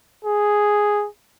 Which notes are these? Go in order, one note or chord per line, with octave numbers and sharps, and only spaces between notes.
G#4